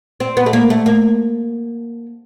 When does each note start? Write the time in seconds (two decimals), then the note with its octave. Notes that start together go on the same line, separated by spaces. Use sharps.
0.20 C4
0.37 B3
0.46 A3
0.53 A#3
0.70 A3
0.86 A#3